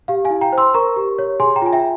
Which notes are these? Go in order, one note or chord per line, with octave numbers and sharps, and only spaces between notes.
G4 F5
F5 G#5
E4
G5 A#5
C5
C6 E6
A#4 A#5 C#6
G4
C#5
G#4 G#5 C6
G5 A#5
F4 G#5
E5 G5